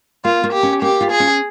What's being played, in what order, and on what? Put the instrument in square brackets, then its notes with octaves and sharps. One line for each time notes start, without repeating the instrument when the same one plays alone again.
[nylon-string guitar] A#3 [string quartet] F4
[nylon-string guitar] A#3
[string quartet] G4
[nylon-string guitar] C#4
[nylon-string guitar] A#3 [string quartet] G4
[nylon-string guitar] F4
[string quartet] G#4
[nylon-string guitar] C#4